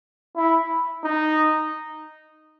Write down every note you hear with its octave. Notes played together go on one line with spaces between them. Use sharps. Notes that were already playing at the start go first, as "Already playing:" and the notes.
E4
D#4